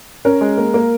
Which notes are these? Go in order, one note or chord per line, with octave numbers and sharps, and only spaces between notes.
C#4 A#4
G#3
A#3
A#3